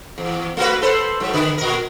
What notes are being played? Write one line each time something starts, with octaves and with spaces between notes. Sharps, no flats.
E2
A3 F#4 B4
A4 B4 C5
G#2 F#3
D3 B4
A#2 A#4